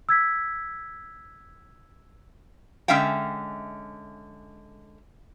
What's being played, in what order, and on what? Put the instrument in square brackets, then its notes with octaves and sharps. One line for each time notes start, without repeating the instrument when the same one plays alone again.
[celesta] E6 G#6 B6
[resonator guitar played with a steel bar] D3 G#3 C#4 E5 F5 G5